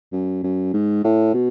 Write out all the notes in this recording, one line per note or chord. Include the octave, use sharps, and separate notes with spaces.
F#2
F#2
G#2
A2
B2